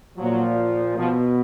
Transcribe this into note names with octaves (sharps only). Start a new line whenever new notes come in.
A#2 F3 F#3
B2 F3